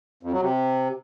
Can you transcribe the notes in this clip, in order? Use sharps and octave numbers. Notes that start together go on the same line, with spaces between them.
F2
F#3
C3